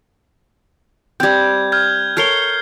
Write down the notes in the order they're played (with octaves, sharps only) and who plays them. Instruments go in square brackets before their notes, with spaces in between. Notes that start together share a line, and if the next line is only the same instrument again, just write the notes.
[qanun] G3 C4 [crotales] G6 G#6
[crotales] F6 G6 G#6
[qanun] A4 A#4 C#5 [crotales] F6 C7 G7